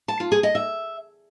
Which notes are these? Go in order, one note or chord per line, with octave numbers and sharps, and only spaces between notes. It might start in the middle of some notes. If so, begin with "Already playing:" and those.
A5
F4
G#4
D#5
E5